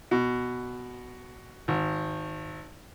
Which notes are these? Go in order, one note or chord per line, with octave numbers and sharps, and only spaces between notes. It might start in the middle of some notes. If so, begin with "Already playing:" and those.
B2
G#1